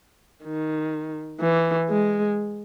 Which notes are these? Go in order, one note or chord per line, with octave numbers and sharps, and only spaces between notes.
D#3
E3
G#3